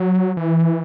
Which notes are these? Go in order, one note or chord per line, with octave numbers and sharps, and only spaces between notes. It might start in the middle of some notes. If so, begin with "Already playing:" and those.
Already playing: F#3
E3